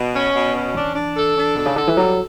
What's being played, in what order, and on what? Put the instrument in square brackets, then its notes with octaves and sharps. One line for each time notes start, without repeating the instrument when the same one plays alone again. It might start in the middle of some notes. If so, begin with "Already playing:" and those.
Already playing: [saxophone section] B2
C#4
B2
C#4
[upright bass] E3 [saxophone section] D4
[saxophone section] D4
A4
D4
[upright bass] B2 [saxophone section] A4
[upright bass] C#3
[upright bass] D3 [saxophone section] A4
[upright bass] E3
[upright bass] F#3 [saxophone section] G3